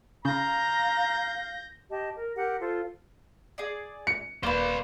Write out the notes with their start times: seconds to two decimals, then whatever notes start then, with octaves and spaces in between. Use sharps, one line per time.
0.25 C#3 F5 A#5 G6 A#6
1.90 G4 D#5 A5
2.17 A#4
2.35 G4 A#4 F#5
2.60 F4 A4 C5
3.58 G#4 D5
4.07 C#7
4.43 D#1 A#3 B4 C5 D5